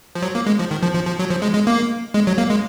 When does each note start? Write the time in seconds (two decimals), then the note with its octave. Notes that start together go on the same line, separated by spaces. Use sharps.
0.15 F3
0.22 F#3
0.35 A#3
0.47 G#3
0.59 F3
0.71 D#3
0.83 F3
0.95 F3
1.07 F3
1.19 F#3
1.30 F3
1.42 G#3
1.55 G#3
1.67 A#3
2.14 G#3
2.27 F#3
2.38 A#3
2.50 G#3